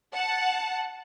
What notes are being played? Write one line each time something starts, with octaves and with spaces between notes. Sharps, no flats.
F#5 A5